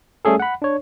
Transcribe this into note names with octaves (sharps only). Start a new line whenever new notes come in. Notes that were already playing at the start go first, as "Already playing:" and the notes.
G3 A3 C#4 G#4 A4
F#5 B5
D4 C#5